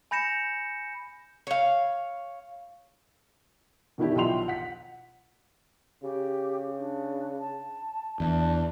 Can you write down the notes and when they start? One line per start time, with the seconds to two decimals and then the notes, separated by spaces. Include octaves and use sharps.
0.11 G#5 B5 G6 A#6 C#7 E7
1.47 C#5 F5
3.98 B2 D#3 D4 E4 G4
4.16 B1 F3 E5 G5 C6 F7
4.48 F#5 B6
6.03 C#3 G4
6.78 D4
7.40 A5
8.20 E2 D4 A5